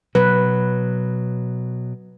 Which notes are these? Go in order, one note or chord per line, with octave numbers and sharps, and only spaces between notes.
B2 F#3 B4